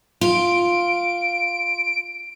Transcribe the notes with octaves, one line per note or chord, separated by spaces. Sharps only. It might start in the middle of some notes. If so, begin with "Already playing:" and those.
F4 D7